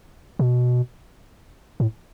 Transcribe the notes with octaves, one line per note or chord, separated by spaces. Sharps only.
B2
A2